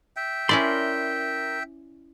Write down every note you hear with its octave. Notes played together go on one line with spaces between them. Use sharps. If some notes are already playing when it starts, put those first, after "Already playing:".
E5 G5
C#4 E4 A#4 D5 C6